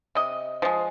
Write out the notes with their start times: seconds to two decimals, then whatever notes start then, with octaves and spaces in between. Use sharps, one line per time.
0.15 C3 D#5
0.62 F3 G#3